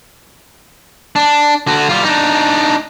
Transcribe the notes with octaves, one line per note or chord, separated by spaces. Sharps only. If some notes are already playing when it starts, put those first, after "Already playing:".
D4
D3 F#4
G3 F4
D4 D#4